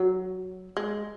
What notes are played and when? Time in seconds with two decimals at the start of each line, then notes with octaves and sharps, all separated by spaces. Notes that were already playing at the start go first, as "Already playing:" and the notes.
Already playing: F#3
0.77 G#3